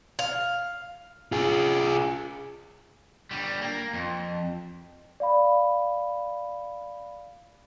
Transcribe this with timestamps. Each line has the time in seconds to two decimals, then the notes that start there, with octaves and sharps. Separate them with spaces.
0.19 F5
1.32 F4 G#4
3.31 D3 G3
3.62 A#3
3.93 F2
5.20 D5 F5 B5